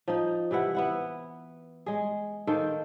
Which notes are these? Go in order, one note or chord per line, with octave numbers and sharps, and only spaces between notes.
F3 D#4
C3 E3 E4 F#5
B3 E4 F#5
G#3 G#4
D#3 A#3 A4 C5